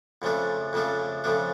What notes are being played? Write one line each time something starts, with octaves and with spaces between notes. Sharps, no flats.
F2 C#3 F3 A3 D4
F2 C#3 F3 A3 D4
F2 C#3 F3 A3 D4